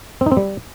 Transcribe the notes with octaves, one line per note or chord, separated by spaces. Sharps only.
C4
D#4
C4
G3